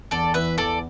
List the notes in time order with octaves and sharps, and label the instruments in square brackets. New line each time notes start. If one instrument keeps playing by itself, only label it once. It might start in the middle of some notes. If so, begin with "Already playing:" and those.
[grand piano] E2 [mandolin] A4 D5
[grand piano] E3 [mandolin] B4 E5
[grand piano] E2 [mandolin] A4 D5